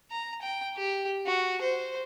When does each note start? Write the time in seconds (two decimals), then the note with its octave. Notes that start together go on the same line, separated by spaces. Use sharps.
0.11 A#5
0.42 G5
0.77 G4
1.27 F#4
1.62 C5